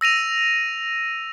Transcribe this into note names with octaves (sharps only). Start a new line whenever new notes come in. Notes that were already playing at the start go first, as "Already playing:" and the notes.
E6 A#6 D#7 F7